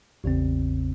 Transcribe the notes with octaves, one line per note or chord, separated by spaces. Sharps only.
A1 E2 C#3 C4